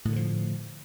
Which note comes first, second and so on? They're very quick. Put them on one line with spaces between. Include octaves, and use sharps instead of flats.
A2 D3 D#3 F3